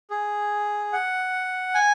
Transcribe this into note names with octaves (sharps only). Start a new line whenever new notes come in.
G#4
F#5
G#5